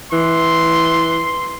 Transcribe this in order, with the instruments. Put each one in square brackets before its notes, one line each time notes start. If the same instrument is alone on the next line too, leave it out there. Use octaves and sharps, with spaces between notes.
[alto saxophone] E3 [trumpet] C6